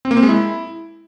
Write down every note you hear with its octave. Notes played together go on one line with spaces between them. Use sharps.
C4
A#3
C4
G#3
E4